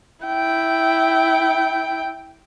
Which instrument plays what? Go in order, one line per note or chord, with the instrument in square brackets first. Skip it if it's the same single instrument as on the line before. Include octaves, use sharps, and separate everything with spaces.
[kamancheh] E4 G5